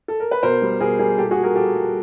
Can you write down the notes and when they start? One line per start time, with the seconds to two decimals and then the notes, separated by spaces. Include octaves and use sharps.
0.08 A4
0.20 A#4
0.31 B4
0.43 B2 A#4 C5
0.62 G3
0.81 B2 G#4 A#4
0.99 G3 G#4 A#4
1.18 A#2 G4 A4
1.31 F#4 G#4
1.37 G3
1.43 G#4 A#4
1.56 A#2 G4 A4
1.75 G3